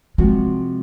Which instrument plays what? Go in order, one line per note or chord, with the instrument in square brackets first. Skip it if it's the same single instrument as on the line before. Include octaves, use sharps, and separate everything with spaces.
[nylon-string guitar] C3 F3 C4 F#4 [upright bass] G#3